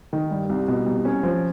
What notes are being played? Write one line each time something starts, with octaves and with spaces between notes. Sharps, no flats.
D#3
G2
C2
B2
C2
C#4
F3